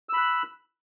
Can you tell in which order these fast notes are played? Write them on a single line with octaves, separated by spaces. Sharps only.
E6 B5 F#6